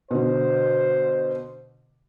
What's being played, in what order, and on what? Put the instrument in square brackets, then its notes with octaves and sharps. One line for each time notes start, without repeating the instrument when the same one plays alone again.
[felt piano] B2 D3 [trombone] C5